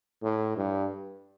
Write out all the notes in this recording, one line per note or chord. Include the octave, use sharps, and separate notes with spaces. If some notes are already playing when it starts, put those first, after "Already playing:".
A2
G2